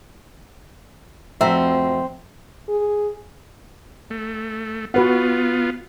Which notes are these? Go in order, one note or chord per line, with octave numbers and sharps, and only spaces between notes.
F2 F3 A3 C4 F#4 E5 A#5
G#4
A3
B3 F4 F#4 B4 F#5